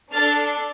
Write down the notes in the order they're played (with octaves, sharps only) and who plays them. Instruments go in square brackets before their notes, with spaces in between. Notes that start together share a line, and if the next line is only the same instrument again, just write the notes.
[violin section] D4 A4 F6 A6